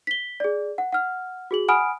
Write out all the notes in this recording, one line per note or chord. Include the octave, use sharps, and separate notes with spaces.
B6 G7
G#4 D5
F#5
F#5 F6
F#4 G#4 F#7
F#5 G#5 B5 D#6 F6 D7